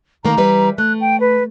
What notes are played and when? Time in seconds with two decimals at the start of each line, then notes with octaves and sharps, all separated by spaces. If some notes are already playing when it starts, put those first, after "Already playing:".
0.25 D#3 A3 A#3 A#5
0.37 E3 G3 B4
0.78 A3 F#6
1.01 G5
1.20 B4